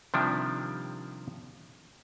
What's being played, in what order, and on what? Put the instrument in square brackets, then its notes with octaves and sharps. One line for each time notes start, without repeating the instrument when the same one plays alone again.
[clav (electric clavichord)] C3 D#3 F3 G3 D4 E4